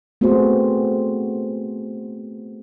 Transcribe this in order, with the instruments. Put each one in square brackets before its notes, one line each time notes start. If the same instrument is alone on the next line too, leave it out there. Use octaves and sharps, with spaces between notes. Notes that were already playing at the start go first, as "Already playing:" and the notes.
[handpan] A3 B3 C4 F#4 G#4 C5